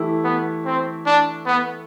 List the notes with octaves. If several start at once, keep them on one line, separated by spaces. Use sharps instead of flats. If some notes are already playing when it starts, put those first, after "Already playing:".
Already playing: E3 A3 E4 G4
B3
C4
D4
B3